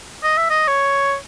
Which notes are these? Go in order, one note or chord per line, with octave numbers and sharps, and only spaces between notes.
D#5
E5
D#5
C#5